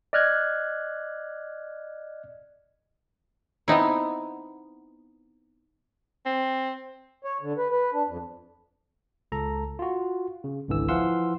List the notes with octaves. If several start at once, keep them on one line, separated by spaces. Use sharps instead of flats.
D5 D#5 F6 F#6 G#6
B3 C4 D#4 E4
C4
C#5
D3
B4
B4
D4
F2
C#2 A4 A#5
F4 F#4
C#3
G#1 C#2 D3 E3 E6
E3 F3 F5 F#5 C6 E6